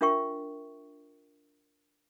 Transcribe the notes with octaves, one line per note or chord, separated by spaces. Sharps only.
D4 F4 A#4 E5 G5 C#6